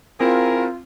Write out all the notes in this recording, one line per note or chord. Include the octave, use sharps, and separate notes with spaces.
C4 E4 F4 G#4 A#4